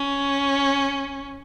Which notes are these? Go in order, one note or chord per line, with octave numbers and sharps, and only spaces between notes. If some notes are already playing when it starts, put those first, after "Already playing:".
Already playing: C#4